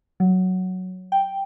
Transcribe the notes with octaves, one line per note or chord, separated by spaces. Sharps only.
F#3
G5